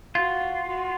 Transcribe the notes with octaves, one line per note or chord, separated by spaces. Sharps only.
F4 F#4
F#4